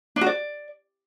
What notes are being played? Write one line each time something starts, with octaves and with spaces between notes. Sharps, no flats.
D4
F#4
D5